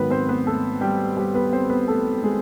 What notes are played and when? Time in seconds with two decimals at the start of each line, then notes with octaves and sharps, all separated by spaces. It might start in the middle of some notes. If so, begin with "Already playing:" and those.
Already playing: G#2 D#3 F#3 B3 B4
0.10 C4 C5
0.29 B3 B4
0.46 A3 A4
0.81 G3 G4
1.17 G3 G4
1.34 B3 B4
1.53 C4 C5
1.70 B3 B4
1.88 A3 A4
2.23 G#3 G#4